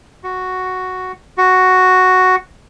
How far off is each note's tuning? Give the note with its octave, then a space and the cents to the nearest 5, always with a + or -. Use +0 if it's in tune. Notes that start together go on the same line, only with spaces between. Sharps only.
F#4 +0
F#4 +0